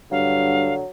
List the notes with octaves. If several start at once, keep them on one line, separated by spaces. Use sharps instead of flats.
G2 D3 F#3 F5